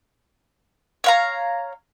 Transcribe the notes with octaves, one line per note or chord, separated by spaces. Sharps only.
C#5 F5 A#5